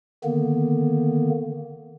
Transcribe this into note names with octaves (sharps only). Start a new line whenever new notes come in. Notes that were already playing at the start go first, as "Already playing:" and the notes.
D3 D#3 A#3 B3